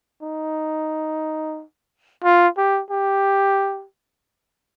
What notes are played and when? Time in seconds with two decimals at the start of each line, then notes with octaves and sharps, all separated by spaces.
0.22 D#4
2.24 F4
2.58 G4
2.91 G4